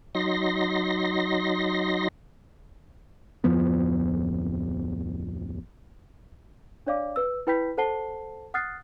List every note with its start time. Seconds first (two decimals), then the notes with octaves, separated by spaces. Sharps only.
0.15 F#3 D#4 C6 A#6
3.44 D1 F2 F3 B3
6.87 D4 C#5 D5 F5 D6
7.16 B4 E6
7.47 E4 B4 G5 B5 G6 B6
7.77 A4 C5 F#5 A5 C7 G7
8.54 F#5 D#6 F6 F#6 A6 C7